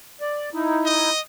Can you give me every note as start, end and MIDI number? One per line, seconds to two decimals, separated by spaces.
0.21 0.49 74
0.54 1.10 63
0.54 1.10 64
0.85 1.20 75